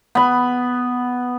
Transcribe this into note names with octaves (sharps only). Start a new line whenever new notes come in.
B3 B5